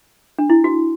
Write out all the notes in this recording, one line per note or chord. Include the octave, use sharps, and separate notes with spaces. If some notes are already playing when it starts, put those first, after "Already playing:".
D4
E4
F#4